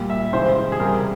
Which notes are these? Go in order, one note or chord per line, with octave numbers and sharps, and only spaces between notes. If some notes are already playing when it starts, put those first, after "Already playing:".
Already playing: A#2 G3
E5
C#3 E3 G#3 C5
G#4
C3 G3 A#4